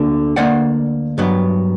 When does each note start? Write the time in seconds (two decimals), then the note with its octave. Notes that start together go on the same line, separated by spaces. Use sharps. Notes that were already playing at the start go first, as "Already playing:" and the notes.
Already playing: D2 D3 A#3
0.36 D2 D3 A#3 D5 F#5
1.18 G2 F#3 B3